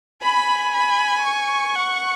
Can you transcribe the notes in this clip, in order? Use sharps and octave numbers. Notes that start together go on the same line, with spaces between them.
G#5 B5
B5
C#6
F#5